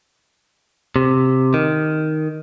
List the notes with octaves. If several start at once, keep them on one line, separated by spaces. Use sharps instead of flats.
C3
D#3